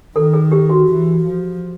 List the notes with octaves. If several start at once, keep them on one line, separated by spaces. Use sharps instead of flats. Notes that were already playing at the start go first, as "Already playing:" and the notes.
D#3 A4
G#4
G4
F#4
E3
F3